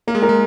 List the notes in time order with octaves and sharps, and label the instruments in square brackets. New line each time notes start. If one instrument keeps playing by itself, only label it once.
[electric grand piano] A#3 [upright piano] A#4
[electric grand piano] G#3
[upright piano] A#4
[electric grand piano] G#3